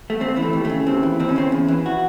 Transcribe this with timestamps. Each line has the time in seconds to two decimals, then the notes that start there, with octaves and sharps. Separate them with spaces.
0.10 A3
0.20 D#2 C4
0.36 E3 C4
0.42 A3
0.53 D#2
0.65 C#3 A3
0.86 D#2 C4
1.03 E3
1.20 D#2 C4
1.29 C#4
1.36 C#3 C4
1.52 E2
1.68 E3
1.86 F#4